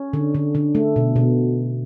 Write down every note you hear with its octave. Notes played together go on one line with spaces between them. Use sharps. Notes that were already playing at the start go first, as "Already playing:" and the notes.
Already playing: C#4
D3
D3
D3
A3
B2
B2